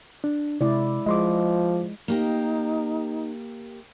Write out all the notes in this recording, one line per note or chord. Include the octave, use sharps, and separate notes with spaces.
D4
C3 G#3 E4 D5
F3 G#3 D#5 C6 D6
A#3 D#4 G4 A#4